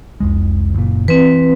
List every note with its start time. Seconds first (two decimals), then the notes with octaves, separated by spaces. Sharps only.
0.20 F1 C2 G#3
0.74 F#1 A#2
1.08 E3 C4 B4